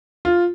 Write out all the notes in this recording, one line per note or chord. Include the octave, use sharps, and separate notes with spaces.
F4